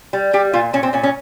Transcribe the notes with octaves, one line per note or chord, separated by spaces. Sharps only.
G3
G3 G4
A#2 F4
A#2 C#4
C4
A#2 C#4
C#4